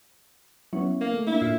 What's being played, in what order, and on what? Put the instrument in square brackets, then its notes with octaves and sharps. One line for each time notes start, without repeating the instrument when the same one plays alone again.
[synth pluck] F#3 [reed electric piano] B3 C#4 E4
[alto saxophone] A#3
[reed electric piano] A3
[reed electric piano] A#3 D4 [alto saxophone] E4
[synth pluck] A2 F4